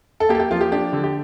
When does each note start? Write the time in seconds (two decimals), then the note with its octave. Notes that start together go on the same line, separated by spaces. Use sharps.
0.20 A4
0.29 A#3 G4
0.35 A4
0.40 G4
0.51 F3 F4
0.61 G4
0.72 D4 G4
0.93 D3
1.04 G4